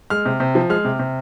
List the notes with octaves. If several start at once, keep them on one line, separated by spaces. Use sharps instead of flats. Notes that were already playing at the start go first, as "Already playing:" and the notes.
G#3 F6
C3
C3
F3
G#3 F6
C3
C3